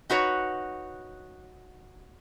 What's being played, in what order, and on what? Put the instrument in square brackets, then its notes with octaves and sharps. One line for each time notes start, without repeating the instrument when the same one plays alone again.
[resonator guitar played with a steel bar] D#4 F#4 B4 C#5